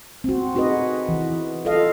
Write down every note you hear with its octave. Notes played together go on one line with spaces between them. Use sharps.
C4 F#4
D#4 F#4 G#4 B4 D#5
E3
F4 A4 D#5 F5